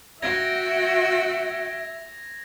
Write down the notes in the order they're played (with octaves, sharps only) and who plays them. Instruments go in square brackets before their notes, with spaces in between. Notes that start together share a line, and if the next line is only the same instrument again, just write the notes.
[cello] F#4 G5 [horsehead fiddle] E5 [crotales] G#6 A#6 F7